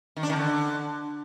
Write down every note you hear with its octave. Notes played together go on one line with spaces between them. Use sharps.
D#3
D4
D#3
D3